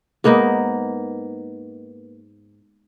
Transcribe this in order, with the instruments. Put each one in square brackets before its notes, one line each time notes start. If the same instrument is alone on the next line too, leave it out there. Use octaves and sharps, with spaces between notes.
[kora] G#2 A#3 B3 D#4